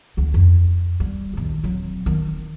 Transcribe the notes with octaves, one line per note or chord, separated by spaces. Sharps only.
D2 D4
F2
G3
A#1 D#2
F#3 C4
D#3